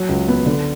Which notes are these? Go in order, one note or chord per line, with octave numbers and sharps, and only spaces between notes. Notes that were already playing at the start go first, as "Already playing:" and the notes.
Already playing: F#3
C#2
B3
D3